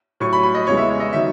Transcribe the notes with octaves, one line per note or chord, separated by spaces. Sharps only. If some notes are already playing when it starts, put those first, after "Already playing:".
A2 F#3 C#6
B5
B5
D#5
E2 C#3 E3 G#3 C#5
E5
C#5
D#5
D#3 F#3 E5